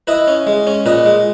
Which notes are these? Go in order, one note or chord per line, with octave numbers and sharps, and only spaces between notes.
E4 B4 D#5
C#4
G#3
C#4
A#2 B4 D#5
G#3